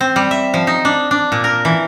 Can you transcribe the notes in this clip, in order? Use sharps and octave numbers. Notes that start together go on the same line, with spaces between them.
C4
G3
E5
F3
D#4
D4
D4
A#2
A#4
E3